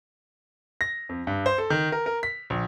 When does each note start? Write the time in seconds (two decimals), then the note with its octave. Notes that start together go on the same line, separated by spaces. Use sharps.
0.81 A#6
1.09 F2
1.27 G2
1.46 C5
1.58 A4
1.70 D#3
1.92 A#4
2.06 A#4
2.23 B6
2.50 A#1